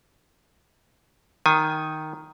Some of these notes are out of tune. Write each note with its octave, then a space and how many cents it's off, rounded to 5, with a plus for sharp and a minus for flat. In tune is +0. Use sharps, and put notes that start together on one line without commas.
D#3 +0 G#5 +0